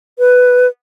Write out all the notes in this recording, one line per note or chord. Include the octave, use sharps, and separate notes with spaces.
B4